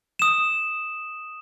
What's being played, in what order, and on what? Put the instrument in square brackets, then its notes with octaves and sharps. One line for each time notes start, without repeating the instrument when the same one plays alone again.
[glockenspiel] D#6 E7